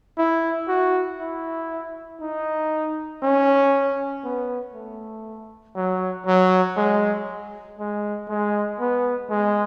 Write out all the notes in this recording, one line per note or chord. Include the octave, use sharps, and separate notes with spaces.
E4
F#4
E4
D#4
C#4
B3
A3
F#3
F#3
G#3
G#3
G#3
B3
G#3